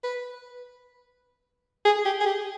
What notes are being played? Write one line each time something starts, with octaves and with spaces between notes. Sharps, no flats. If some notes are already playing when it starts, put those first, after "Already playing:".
B4
G#4
G4
G#4
G4